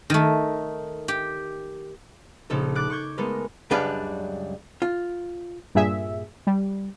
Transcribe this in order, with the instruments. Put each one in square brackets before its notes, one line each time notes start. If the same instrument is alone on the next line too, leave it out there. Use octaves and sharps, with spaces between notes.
[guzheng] D#3 A3
G4
[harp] A#1 C#3 D#4 A4
D6 F#6 A6
C#6 D6 G6 G#6
G#3 A3 B3 A4 A#4
[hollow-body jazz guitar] C#2 F#2 G3 D4 B4 F5
F4
[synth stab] G2 A#2 G#4 E5
G3